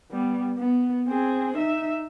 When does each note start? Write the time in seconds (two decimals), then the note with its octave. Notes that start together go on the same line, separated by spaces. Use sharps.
0.11 G3 B3
0.58 B3
1.08 C4 G#4
1.56 D#4 E5